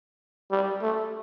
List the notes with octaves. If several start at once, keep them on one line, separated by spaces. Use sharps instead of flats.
G3
A3